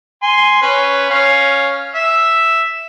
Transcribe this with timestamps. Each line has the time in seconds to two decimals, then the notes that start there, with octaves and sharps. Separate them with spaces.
0.22 G#5 C6
0.62 C#4 B4
1.10 C#4 F5
1.95 E5